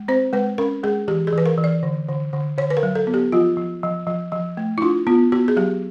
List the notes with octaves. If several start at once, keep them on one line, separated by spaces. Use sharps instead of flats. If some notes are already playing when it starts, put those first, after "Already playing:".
Already playing: G#3
C4 C5
G#3 B4
C#4 A#4
G#3 G#4
E3 G4
G#4
E3 B4
A#4
E3
D5
D3
D3
D3
D3 C#5
B4
A#4
F#3
A4
B3
G4
F3 F4
F3
F3
F3
F3
A3
E4
D4 F4
B3 F4
B3 F#4
G#4
F#3 G4